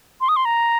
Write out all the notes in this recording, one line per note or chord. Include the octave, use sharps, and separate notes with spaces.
C6
D#6
C6
A#5